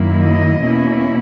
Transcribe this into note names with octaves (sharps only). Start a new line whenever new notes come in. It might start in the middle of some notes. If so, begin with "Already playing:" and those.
Already playing: F#2 D#3 F#3 A#3 E4
D#5
E2 B2 A#3 C#4 E4